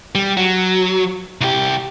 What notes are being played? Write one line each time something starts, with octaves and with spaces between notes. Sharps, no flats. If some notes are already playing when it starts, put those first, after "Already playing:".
G3
F#3
C2 G4